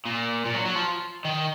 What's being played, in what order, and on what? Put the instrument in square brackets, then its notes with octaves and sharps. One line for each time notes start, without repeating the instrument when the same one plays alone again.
[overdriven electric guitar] A#2
A#2
F#3
F#3
F3
D#3